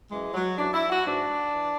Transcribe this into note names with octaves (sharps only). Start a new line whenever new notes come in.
F#2 E3 G#3
F#3
F#2 E3 D4
E4
F#4
G#2 E3 D4
E3